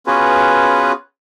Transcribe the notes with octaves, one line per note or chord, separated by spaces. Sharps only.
B3 C#4 F4 F#4 G#4 B4